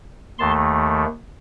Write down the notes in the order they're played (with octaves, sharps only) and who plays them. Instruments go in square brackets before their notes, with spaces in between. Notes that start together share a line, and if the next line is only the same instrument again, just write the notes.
[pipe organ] D#2 D#3 A3 A5 C6